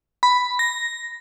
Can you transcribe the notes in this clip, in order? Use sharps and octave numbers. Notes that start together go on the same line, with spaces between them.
B5
A#6